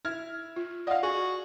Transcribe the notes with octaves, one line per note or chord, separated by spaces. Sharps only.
E4 F6 G#6
F4
D5 D#5 F5 F#5
F#4 G#4